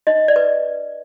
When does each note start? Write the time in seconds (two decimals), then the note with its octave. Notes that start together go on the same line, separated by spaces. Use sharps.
0.07 D#4 D#5
0.28 D5
0.36 B4